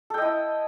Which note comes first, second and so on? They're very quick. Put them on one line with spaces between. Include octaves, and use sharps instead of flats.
A4 G5 D#5 E4